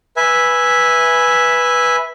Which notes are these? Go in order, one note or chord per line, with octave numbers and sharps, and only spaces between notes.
B4 E5 G#5